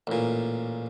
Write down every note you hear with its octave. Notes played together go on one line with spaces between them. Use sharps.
A1 A#2